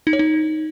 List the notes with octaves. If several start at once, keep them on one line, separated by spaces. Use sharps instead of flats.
D#4
C#5
D#4